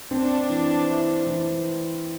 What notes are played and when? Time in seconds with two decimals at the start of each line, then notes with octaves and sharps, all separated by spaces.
0.11 C4 D4
0.49 E3
0.89 E4
1.26 E3